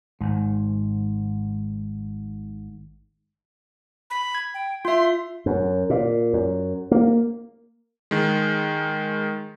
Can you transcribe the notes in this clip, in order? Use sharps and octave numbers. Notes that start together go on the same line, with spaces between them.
G#1 G#2
B5
G#6
G5
F4 E5 C6
F#2
A#2
F#2
A#3
D#3 G#3